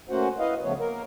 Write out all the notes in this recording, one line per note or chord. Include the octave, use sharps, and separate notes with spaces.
A3 A#3 C#4 F#4 C5 F#5
E4 B4 D#5 F5
C#3 F3 A3 B3 C#5
A#3 A#4